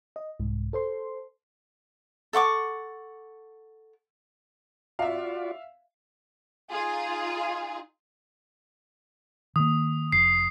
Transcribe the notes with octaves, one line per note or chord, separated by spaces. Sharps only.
D#5
C2 G#2
A4 C5 C6
A4 F#5 C#6 D6
F4 F#4 D5 E5 F5
D#4 F4 G#4
D#3 A#3 D#6
F1 C7